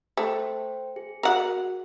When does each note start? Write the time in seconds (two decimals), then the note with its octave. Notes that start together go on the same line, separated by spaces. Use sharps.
0.17 A3 C5 G5
0.96 G#4
1.23 F#4 A#4 F#5